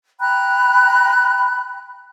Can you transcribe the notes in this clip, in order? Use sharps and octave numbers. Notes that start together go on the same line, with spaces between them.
G5 A#5 B5 F#6